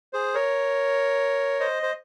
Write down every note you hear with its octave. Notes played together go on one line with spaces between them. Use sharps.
G#4 C5
A#4 C#5
C5 D#5
C5